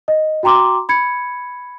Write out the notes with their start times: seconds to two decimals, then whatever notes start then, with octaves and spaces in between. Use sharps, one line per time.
0.08 D#5
0.43 F#4 G5 A#5 C6 D6
0.89 B5 G#6 C#7